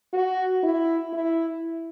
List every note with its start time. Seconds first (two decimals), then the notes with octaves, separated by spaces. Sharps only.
0.13 F#4
0.63 E4
1.13 E4